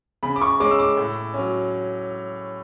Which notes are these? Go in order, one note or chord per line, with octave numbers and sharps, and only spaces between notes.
C#3 B5
D6
C#6
G#3 C#4 D6
E6
D6
A2
F#3 C#4